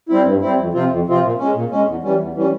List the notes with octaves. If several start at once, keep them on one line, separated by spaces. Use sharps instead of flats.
G3 C4 E4
G2
G3 C4 E4
F2
C3 F3 C4 F4
F2
C3 F3 C4 F4
A#2
G#3 C#4
A#2
G#3 C#4
E2
E3 G3 C#4
E2
E3 G3 C#4